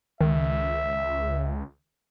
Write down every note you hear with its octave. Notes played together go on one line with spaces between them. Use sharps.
C#2 D#3 E5